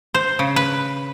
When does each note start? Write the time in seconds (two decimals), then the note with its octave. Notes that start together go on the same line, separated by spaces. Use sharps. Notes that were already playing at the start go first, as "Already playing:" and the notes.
0.14 C5
0.39 C#3
0.56 B4